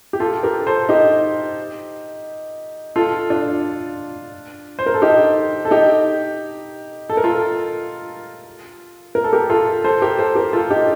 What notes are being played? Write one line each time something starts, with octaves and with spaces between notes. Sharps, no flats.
G4
F4 A4
G4 A#4
A4 C5
D#4 G4
F4 A4
D4 F4
C5
A#4
A4
D#4 G4
A4
D#4 G4
A4
A#4
F4 A4
A#4
A4
G4 A#4
F4 A4
A4 C5
G4 A#4
A4 C5
G4 A#4
F4 A4
D#4 G4